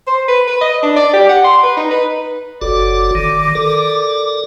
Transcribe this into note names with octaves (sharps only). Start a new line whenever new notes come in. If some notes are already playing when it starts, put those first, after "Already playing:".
C5
B4
B4
D#5
D4
D5
G4
F#5
C6
B4
D#4
B4
F#1 F#4 A4 D5 D6
D#3
A4 A#4